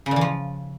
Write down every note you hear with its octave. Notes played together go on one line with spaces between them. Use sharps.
C#3
A#2
E3
F3